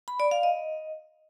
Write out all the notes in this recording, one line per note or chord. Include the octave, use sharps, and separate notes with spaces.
B5
D5
F5
D#5